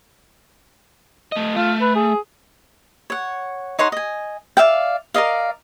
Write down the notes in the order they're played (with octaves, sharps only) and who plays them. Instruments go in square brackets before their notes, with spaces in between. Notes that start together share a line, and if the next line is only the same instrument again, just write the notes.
[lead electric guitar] A3 D#5
[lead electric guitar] A3 [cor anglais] F4
[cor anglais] B4
G#4
[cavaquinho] C#5 F#5
D#4 C#5 F#5 C6
D#5 G#5
D5 E5 F5 G5
A#4 D5 D#5 F5